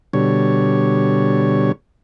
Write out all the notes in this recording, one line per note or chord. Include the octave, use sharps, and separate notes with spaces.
B2 D3 G3 C#5